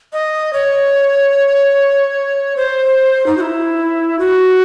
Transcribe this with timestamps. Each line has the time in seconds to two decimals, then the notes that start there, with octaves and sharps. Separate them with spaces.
0.13 D#5
0.53 C#5
2.56 C5
3.27 D#4
3.37 F#4
3.41 E4
4.19 F#4